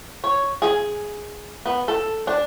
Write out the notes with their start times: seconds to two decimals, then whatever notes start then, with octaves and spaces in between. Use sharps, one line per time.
0.24 C#5
0.62 G#4
1.66 B3
1.88 A4
2.27 D4